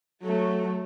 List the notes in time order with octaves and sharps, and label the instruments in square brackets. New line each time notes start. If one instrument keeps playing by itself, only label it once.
[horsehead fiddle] F#3 A3